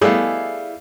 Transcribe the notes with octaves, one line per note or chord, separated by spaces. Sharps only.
G3 A3 B3 E4 G#4 D5 D#5 F5